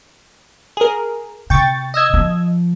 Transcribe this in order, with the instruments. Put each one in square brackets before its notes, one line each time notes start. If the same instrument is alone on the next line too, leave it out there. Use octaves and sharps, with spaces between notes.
[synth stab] G#4 A#4
[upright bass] C3 [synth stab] G5 C#6 A6
[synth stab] D#5 E6 G#6
[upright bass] F3